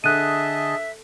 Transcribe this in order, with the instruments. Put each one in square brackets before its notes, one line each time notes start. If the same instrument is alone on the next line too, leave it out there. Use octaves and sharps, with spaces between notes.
[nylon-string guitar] D3 [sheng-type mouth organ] G#4 D#5 A5 [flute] E5 [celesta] F#6 D#7